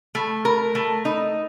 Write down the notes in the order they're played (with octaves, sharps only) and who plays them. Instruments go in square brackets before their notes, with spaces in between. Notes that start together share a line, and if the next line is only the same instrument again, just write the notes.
[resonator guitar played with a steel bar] A3
A#4
A3
D#4